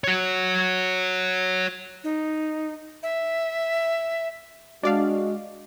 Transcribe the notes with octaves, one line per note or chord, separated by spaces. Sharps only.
F#4 C#5
D#4
E5
G#3 D4 F#4 D5 F5